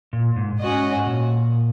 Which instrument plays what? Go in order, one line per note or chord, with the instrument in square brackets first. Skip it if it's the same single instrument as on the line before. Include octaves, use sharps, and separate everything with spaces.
[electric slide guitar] A#2
G#2
[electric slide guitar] G#2 [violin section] C#4 F#4 D#5
[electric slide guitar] A#2